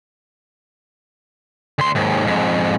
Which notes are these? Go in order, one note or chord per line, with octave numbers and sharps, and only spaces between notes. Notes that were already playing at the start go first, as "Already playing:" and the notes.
D2 C6
D#2 G#2
F2 G#2